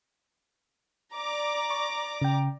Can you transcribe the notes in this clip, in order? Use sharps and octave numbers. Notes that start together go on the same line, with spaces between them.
D5 A#5 D6
C#6
C#3 G5